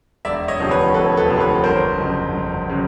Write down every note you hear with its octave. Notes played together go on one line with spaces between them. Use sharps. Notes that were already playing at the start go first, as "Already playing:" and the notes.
E1 D5 E5
C#5 D#5
D2 C3 F3
B4 C#5
E1 A4 B4
A4 B4
D2 C3 F3
B4 C#5
G1 A#4 C5
F2 C#3 F#3
G1
C#3 F#3